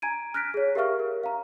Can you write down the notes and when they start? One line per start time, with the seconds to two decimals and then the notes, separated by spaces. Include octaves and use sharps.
0.02 G#5 A#5 G#6 D7 D#7
0.34 F6 F#6 A#6 B6 D7
0.54 G#4 C#5
0.75 G4 A#4 E5 F5 C#6 F6
0.99 A#4
1.24 F5 A#5